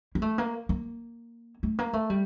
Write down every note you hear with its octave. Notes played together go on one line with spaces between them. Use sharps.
A#3
A3
A#3
A#3
A3
A#3
A3
G3